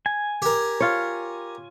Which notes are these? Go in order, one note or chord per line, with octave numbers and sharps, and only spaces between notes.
G#5
G4 A#4
F4 C#5